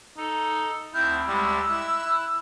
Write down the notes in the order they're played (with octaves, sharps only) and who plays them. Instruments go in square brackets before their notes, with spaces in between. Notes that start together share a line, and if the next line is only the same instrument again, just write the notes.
[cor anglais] D#4 [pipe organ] A4
[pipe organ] D2 C4 F6 [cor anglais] E4 [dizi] G6
[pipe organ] D2 G#3 [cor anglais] G3 [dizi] E6
[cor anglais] E4 [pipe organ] F#6
[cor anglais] E4